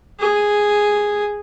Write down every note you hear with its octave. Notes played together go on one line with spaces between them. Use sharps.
G#4